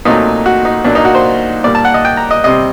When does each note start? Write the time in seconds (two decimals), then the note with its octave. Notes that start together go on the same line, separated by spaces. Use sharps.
0.05 A#2 F#3 A3 C4 D#4
0.46 F#4
0.65 D#4
0.84 A#2 F#3 A#3 D4
0.95 D#4
1.05 F#4
1.15 C5
1.64 A#2 G3 A#3 D5
1.75 A5
1.85 F#5
1.94 D#5
2.05 G5
2.17 A#5
2.31 D#5
2.44 C3 G3 C4 D#5